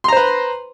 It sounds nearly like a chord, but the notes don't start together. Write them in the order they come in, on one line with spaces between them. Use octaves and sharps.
C6 A#5 C5 B4